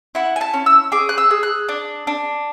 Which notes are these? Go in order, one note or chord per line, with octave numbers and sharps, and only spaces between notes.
E4 F#5
G#5
A5
C#4
E6
G#4 D6
F#6
E6
G#4
F#6
D4
D4